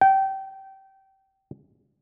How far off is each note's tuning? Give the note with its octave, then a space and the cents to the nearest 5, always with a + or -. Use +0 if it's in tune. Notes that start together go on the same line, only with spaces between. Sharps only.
G5 -25